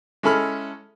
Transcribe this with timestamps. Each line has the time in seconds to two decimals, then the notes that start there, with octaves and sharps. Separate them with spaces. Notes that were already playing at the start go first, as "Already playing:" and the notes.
0.23 G#3 C#4 E4 A4 B5 F6